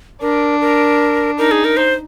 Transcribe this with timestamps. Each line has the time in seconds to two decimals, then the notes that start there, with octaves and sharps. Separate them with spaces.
0.21 D4 A#4
0.61 A#4
1.38 D#4 A#4
1.51 G#4
1.65 A#4
1.77 C5